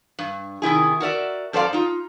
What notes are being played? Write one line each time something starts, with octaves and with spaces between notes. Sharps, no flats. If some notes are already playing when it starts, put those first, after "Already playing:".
G2
C3 D#3 E4 G#4
F#4 A#4 D5 E5
F#2 A4 C5 D5 F5 A#5
D#4 F4